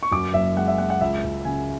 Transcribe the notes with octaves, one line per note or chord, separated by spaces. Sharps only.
C#6
F#2 D6
F#1 E5
G#3 F#5
E5
G#3 F#5
F#5
C#2 E5
C#2
C#3 G#5